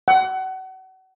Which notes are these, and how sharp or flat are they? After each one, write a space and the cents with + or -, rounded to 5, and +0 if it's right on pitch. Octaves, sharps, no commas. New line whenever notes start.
F#5 +30